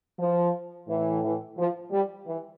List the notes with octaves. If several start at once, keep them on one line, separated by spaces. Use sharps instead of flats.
F3
A2 E3
E3
F3
G3
E3